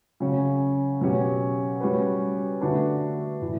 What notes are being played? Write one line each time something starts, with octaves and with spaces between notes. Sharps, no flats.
C#3 F#3 C#4
B2 F#3 C#4 G4
G3 C#4 F#4 B4
D3 A3 D4 F#4 B4
A2 E3